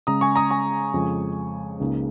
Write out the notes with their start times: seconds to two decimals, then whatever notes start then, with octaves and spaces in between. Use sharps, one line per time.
0.07 C#3 G#3 C#4 A#5 D#6
0.21 G#5 C#6
0.36 A#5 D#6
0.51 G#5 C#6
0.94 F2 C#3 F3 G#3
1.80 C#2 C#3 A#3 D#4